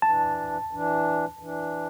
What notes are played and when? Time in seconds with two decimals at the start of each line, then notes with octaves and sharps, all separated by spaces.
0.02 E3 D4 A5
0.71 E3 D4
1.39 E3 D4